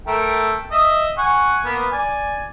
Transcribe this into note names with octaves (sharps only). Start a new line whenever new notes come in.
A3 A#4 G5
D#5 E5 D#6
F#5 G#5 C#6
A#3 B3
D5 G#5